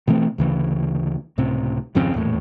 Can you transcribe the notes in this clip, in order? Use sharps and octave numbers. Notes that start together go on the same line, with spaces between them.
B2 E3 A3 C4
D2 C#3 E3
C#2 A2 C3 C4
G#1 F2 C#3 C4
D#1 E2 A2